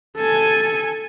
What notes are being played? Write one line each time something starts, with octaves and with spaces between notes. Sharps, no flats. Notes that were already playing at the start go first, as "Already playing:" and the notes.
A4 G#5